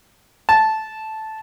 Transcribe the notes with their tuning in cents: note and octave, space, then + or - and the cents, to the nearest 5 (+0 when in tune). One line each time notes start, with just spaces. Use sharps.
A5 -10